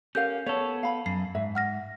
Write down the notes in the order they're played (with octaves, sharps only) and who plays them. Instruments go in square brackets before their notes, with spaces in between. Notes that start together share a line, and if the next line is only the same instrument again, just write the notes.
[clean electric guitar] C#4 [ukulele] G4 A#4 F5 [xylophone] G6
[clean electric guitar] B3 A4 [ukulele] C#5
[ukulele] F5 B5
[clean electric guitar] F#2 [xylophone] C7
[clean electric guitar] G#2 [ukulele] E5
[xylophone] F#5 F6 A#6